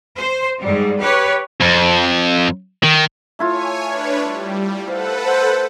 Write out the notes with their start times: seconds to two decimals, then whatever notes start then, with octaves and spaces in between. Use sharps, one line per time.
0.17 C5
0.59 G#2 G3
1.00 G4 B4 C#5
1.60 F2
2.83 D#3
3.39 A3 E4 F4 C#5 G#5
3.85 D4 B4 C#5
4.22 G3
4.88 A4 B4 C5 F5 F#5
5.24 C5